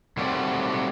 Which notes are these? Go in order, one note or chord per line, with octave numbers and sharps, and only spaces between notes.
D#3 F#3 G3 A3 C4 D5